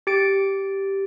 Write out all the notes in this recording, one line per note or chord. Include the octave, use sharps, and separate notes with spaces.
G4 A6 D7